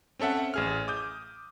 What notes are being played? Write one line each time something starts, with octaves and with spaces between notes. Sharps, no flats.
C4 C#4 A4 E5 F#5
A1 G#4 F6
D6 D#6 G6